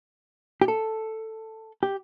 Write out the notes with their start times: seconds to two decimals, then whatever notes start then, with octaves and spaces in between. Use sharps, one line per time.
0.61 G4
0.68 A4
1.83 G4